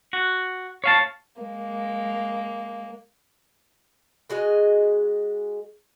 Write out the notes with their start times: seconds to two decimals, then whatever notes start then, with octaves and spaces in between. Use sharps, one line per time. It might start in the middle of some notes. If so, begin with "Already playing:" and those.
0.13 F#4
0.84 C#5 F5 A5
1.41 G#3 A#3
4.30 G#3 F#4 G#4 D#5